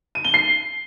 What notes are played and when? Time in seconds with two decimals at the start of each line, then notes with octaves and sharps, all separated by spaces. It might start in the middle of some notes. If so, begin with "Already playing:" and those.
0.15 D#7
0.24 G7
0.34 C7